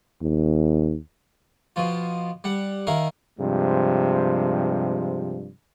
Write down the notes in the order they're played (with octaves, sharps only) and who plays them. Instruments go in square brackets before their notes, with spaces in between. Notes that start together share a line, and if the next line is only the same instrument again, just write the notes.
[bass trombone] D#2
[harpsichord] B2 F3 F4
G3 F#5
D#3 E4 A#4 F5
[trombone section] G2 C3 F3 G#3